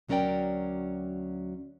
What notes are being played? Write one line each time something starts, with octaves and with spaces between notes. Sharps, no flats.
D2 F#3 C#4 A#4 D5 G5